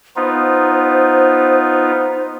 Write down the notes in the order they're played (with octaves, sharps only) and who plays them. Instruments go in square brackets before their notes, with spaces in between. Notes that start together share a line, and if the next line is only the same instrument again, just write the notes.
[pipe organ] B3 D#4 F4 [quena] C5